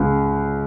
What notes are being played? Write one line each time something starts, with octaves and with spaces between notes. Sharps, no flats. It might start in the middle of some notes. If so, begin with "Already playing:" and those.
Already playing: C#2